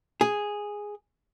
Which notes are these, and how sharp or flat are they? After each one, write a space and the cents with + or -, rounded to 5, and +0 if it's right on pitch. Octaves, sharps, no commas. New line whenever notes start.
G#4 -5